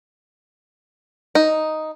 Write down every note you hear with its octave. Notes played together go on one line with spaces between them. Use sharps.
D#4